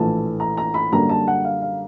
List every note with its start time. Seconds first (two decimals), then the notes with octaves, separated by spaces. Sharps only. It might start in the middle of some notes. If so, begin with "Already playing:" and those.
Already playing: A#1 A2 E3 A3 A5
0.40 A#5
0.57 A#5
0.74 B5
0.92 F#2 D3 G3 A#3 A#5
1.09 A5
1.28 F#5
1.45 F5
1.62 F5